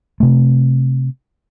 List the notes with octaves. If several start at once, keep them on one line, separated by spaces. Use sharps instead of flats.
C3 A3